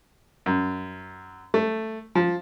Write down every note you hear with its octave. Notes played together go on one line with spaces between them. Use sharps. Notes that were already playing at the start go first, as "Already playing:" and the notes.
F#2
A3
F3